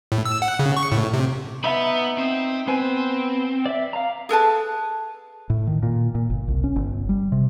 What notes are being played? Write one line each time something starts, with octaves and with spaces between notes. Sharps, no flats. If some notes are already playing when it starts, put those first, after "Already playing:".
A2
E6
F#5
C#3
C#6
A2
C3
B3 D#4 E5 A#5 B5
C4
B3 C4 C5 G#5
D5 E5
F5 A#5
G#4 A4 B4 A5
A2
D#3
A#2
A#2
G1
C2
C#4
G1
G3
C3